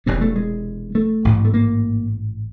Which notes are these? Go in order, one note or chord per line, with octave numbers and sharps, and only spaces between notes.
E1 E2 C3 B3
A3
G#3
A3
A1 G#2
A3
A#3